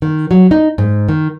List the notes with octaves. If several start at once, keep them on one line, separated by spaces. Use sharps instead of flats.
D#3
F#3
D#4
G#2
D#3